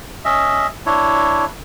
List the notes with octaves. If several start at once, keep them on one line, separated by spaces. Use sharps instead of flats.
C#4 D#5 E5
D4 E4 C#5